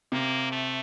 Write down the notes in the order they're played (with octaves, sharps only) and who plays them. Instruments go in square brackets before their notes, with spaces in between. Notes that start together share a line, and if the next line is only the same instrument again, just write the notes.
[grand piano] C3 [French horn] A#3
[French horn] A3